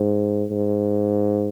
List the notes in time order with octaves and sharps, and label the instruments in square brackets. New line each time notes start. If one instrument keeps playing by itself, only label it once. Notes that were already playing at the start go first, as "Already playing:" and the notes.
Already playing: [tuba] G#2
G#2